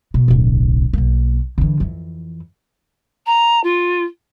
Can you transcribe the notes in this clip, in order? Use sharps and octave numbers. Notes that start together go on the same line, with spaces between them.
B2
D1 B1
B1 A#3
D3 E3
F2 E3
A#5
F4